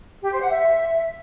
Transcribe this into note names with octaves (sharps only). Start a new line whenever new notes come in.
G4
C5
F#5
E5